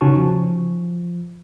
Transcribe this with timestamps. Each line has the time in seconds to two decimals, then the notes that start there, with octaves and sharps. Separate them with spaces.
0.01 C#3 C#4 D#4 F#4 A5 C#6
0.16 F3